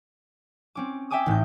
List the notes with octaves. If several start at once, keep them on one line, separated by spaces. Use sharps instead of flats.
C4 C#4 D6
E5 G5 G#5 D6 D#6
A1 A2 D#4 G6